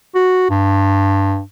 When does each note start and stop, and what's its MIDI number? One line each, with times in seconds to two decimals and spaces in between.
0.15 0.45 66
0.50 1.41 43